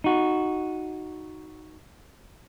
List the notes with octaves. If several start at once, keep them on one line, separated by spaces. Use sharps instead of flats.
D#4 F#4